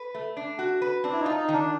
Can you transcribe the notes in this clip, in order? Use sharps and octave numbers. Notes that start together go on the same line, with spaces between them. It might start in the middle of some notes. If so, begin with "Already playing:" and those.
Already playing: B4
A3
D4
F#4
B4
C4 D4
E4
D#4
F4
D#4
D#3 D4